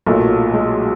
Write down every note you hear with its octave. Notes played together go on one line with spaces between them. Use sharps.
B1 A#2 F#3 A3
G#3